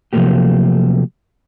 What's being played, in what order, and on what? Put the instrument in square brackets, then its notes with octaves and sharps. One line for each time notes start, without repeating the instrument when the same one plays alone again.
[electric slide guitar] C3 F3 F#3 A3 A#3 G4